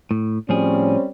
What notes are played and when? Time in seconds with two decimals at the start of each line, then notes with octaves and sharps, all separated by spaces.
0.11 A2
0.49 A2 F3 G3 C4 C#4 G#4